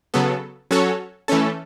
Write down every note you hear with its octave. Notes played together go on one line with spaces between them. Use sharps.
C#3 F#3 B3 A4
F#3 C#4 F#4 A4 C#5
E3 A3 C#4 A4